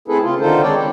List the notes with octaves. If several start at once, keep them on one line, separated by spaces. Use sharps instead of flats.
A3 C4 E4 G#4 A4 B4
C#3 F4
D3 D#3 D#4 F4 A4 C5
G#3 C4 D4 C#5 D5 G5
B4